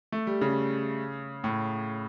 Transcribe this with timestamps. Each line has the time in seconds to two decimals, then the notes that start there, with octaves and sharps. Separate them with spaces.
0.12 A3
0.27 G3
0.41 C#3
1.44 A2